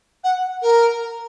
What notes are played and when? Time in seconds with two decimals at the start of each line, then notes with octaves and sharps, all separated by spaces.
0.24 F#5
0.62 A#4